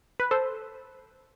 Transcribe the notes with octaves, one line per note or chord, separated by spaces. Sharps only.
B4
A4 C5